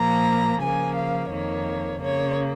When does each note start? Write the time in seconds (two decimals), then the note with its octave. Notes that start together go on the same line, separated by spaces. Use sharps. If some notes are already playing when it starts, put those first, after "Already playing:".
Already playing: A#2 F3 A#3 A#5
0.61 C#3 F3 A#3 G#5
0.96 F5
1.31 F2 D#3 A#3 C#5
2.02 C#3 A#3 C#5